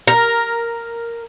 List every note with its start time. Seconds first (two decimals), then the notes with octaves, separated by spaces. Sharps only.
0.07 A#4